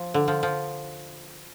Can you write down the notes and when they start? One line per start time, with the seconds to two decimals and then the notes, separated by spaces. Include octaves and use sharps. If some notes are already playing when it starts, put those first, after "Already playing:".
Already playing: F3
0.14 D3
0.28 F3
0.43 F3